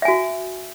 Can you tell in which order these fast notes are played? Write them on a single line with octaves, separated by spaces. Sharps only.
E5 G#5 F#4